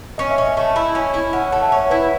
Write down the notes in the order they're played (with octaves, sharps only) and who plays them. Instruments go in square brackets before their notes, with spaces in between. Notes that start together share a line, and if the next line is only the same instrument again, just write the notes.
[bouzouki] C#4 [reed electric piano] D#5
[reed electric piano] E5
[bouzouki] C#4 [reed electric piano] D#5
[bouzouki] A3
E4
C#4
E4
[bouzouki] C#4 [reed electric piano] F#5
[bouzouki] A3 [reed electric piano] F#5
[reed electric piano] E5
[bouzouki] C#4 [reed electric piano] C#5
[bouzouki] E4 [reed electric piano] B4